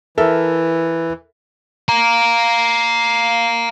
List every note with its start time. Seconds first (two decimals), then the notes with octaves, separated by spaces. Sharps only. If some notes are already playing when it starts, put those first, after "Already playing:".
0.18 E3 A4 A#4 E5
1.88 F5 A#5